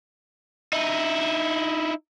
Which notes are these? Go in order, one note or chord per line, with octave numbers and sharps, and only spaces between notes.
D#4 E4